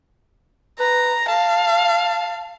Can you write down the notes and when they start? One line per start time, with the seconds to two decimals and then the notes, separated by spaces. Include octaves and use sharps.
0.79 B4 A#5
1.28 F5 A5